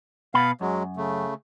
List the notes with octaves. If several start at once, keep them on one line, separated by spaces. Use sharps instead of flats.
B2 B3 F5 B5
F#2 F#3 G#3
C#3 A3